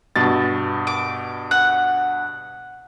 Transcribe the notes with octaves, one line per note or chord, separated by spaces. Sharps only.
G2 B2 A6
D6
F#5